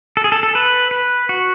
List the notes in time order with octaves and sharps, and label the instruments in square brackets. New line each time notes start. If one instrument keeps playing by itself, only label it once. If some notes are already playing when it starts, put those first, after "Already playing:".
[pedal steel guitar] A4
G#4
A4
A4
B4
B4
F#4